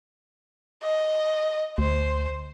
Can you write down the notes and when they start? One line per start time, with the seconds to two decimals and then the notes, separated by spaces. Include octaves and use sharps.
0.83 D#5
1.78 D2 C5